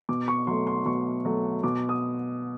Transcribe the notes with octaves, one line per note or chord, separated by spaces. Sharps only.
B2 D6
C#6
F#3 A3 C6
C6
B2 C#6
F#3 A3
B2 D6
D#6